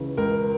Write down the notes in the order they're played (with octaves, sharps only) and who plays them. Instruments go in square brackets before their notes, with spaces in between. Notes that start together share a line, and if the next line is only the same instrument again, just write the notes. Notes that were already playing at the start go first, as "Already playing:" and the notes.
Already playing: [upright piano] C#2 C#3 E3
C#2 A#4